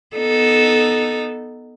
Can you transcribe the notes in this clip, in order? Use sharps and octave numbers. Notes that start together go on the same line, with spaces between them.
B3 D#4 A4